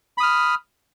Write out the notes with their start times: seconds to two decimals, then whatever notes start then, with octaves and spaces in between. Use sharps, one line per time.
0.18 B5
0.20 D#6
0.23 F6